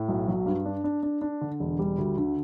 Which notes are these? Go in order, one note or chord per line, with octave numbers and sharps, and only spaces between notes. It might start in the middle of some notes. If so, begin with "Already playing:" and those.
Already playing: A2
B1
F#3
G2
D4
D4
D4
D4
D3
E1
G3
D2
D3